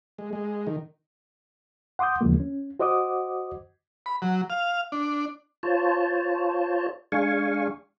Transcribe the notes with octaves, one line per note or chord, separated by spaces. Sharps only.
G#3
G#3
D#3
F#5 C6 D6 D#6 G6
D#2 C#3 E3 F3 G#3 A#3
C#4
F#4 C5 D#5 F#5 D6 D#6
B5
F#3
F5
D4
F4 C5 C#5 A5
G#3 D4 F5 G#5 C#6